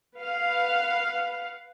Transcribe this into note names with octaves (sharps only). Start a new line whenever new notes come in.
B4 F5 F#5